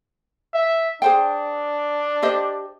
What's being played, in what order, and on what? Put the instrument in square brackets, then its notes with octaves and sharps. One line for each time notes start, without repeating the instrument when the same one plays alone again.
[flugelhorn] E5
[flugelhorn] D4 [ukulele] G#4 C5 G5
[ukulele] G4 C5 D#5